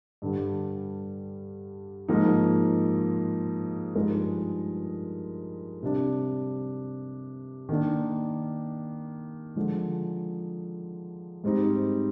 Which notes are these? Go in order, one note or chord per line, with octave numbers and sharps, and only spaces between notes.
G2 D3 G3
G#2 F3 A#3 D#4
G2 F3 G#3 D#4 A#4
C3 G3 D4
D#3 A#3 D4
D3 F3 G#3
G#2 G3 C4 D#4